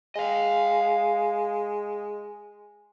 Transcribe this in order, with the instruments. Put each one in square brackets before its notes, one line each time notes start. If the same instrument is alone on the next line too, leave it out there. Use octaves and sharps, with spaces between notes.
[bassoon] G#3 [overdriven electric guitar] D#5 F5